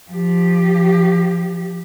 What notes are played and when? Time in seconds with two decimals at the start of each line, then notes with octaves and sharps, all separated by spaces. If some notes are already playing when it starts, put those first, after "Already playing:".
0.10 F3 G4